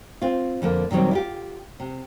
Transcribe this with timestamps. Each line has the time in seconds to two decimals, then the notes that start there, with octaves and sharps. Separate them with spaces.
0.22 C4 F4
0.62 F2 D3 A#3
0.91 A#2 D#3 F#3 G3 C4
1.11 E4 F4 G4
1.80 C3